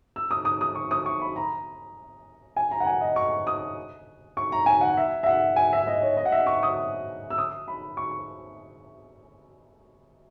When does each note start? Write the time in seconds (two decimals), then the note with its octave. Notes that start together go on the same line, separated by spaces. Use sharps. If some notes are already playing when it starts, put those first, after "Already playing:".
0.16 E6
0.31 D#6
0.45 D#6
0.61 D#6
0.75 C#6
0.91 D#6
1.06 C#6
1.21 B5
1.36 A#5
2.56 G#5
2.71 A#5
2.80 F#5
2.86 G#5
3.01 D#5
3.16 C#6
3.47 D#6
4.37 C#6
4.52 A#5
4.66 G#5
4.81 F#5
4.97 E5
5.23 E5
5.26 F#5
5.56 G#5
5.73 E5
5.87 D#5
6.02 C#5
6.17 D#5
6.26 F#5
6.32 E5
6.47 C#6
6.63 D#6
7.30 E6
7.38 D#6
7.68 B5
7.97 C#6